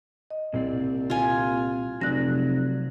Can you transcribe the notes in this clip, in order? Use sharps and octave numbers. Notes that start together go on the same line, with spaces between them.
D#5
C2 A#2 C4 D5
F4 G#5
F1 C3 F#3 D5 F#6 A#6